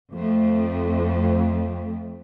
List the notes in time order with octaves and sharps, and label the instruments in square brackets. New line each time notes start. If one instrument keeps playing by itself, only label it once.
[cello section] F2 A3